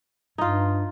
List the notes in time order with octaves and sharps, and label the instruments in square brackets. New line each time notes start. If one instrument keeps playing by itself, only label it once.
[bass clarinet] G2 [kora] D#4 F4